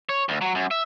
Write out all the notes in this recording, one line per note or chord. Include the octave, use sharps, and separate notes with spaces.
C#5
D2
F#3
F#2
E5